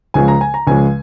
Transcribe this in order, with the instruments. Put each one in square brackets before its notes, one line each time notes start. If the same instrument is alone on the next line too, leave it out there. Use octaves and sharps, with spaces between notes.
[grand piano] C#2 C#3 F3 G#3 G#5
A#5
G#5
A#5
C#2 C#3 F3 G#3 G#5